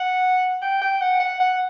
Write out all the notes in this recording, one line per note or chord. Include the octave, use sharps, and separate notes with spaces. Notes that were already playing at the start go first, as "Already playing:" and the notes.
Already playing: F#5
G5
G5
F#5
F#5
F#5